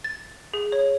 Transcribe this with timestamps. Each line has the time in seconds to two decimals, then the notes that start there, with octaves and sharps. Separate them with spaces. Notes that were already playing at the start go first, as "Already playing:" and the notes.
0.04 A6
0.54 G#4
0.72 C#5